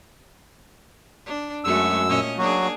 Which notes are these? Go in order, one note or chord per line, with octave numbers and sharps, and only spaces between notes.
D4
F#2 G#3 A3 F#4 E6
A#2 C#4 D#5
F#3 A#3 D4 F#4 G#4